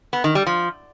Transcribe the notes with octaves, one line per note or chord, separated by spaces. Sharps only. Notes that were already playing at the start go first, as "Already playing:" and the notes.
B3
D#3
G3
F3